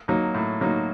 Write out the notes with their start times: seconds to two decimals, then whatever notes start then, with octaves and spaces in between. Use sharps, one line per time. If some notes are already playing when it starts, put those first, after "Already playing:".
0.08 F#3 A#3 D#4
0.34 A2
0.61 F#3 A#3 D#4